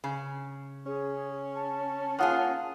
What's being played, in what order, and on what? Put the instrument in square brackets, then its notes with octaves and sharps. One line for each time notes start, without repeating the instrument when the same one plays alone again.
[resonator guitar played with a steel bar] C#3
[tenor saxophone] C#4 [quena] G#4
[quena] A5
[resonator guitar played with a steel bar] A#3 F4 G#4 [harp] F#5 D#6 F6